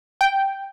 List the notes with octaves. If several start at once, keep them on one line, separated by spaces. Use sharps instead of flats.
G5